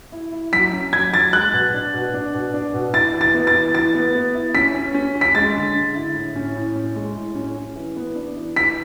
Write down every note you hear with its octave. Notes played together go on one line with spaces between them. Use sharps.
E4
E4
F#3 B6
C#4
F#3 G#6
F#3 A6
G#3 F#6
B2
D4
B2
D4
B2
D4
B2
E4 A6
E3
A6
B3
A6
E3
E3 A6
B3
B3
E4
C#4 B6
C#4
C#4
C#4
B6
G#3 A6
D3
D3
E4
A2
C#4
A2
C#4
G#3
A2
C#4
C#4
E3
B3
D4
E3
E3 B6